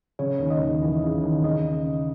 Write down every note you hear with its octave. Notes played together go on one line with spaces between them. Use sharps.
C#3 C#5
D#2
D#5
D#2
E3
C#3
D#2
C#3 D#5